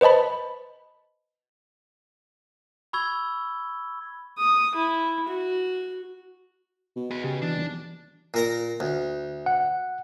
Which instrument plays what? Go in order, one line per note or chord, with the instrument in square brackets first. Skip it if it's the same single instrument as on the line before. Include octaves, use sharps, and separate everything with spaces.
[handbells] B4 C5 D#5 A5 B5
[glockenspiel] B5 C#6 E6 G#6 G7
[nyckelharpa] D#6
E4
F#4
[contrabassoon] B2
[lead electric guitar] G#4 B4
[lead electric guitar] C#3 [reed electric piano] G4
[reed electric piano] E3 [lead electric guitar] D4
[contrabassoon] D#1
[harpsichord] A#2 A#4 A#5
D2
[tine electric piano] F#5